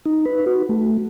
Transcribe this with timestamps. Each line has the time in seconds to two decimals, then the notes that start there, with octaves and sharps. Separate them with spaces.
0.06 D#4
0.25 B4
0.46 F#4
0.69 A3